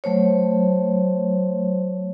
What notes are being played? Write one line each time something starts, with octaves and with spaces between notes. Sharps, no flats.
F#3 A3 C5 C#5